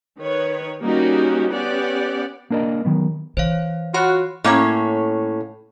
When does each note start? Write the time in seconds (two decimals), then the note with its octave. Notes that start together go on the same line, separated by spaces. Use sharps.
0.19 D#3 B4 C#5
0.81 G3 A#3 C#4 D#4 F#4 G4
1.49 B3 C#4 G4 D5 F#5
2.50 A#3 D4 A#4 D5 D#5
2.85 D#3 F#3 B3
3.37 E3 C5 C#5 F5
3.94 F4 F#4 C#5 B5 C6
4.44 A2 A#3 C#4 C#5